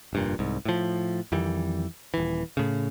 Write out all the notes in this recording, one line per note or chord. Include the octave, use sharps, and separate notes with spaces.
F1 G2 A#2
C2 G#2
A2 F3
F2 D#3 E3 G3
D#1 E3
A2 C#3